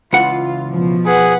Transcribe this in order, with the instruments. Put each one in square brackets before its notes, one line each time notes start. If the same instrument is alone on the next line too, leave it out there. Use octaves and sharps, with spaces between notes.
[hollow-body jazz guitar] C#2 E3 F#5 [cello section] F4
[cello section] B2 F3
[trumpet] G#4 [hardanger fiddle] B4 F#5